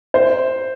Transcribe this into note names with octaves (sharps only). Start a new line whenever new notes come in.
C5